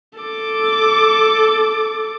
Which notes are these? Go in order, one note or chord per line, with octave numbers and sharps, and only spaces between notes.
A4 D6